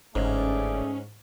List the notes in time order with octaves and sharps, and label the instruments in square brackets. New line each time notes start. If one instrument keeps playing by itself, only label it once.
[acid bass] G1 [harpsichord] G#2 [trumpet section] A3 G#4 D5 [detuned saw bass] C#4